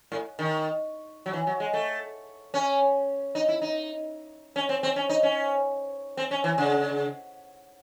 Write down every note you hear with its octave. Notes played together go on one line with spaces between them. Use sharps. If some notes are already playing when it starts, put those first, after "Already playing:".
A2
D#3
F#3
E3
F#3
G#3
A3
C#4
D#4
E4
D#4
C#4
C4
C4
C#4
D#4
C#4
C4
C#4
E3
C#3